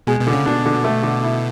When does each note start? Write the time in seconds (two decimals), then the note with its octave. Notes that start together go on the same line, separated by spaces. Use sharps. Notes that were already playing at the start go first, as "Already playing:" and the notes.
0.07 B2 G#3
0.20 B2
0.27 D3
0.33 C#3
0.46 B2 D4
0.65 D3
0.84 A3
1.03 D3
1.23 E4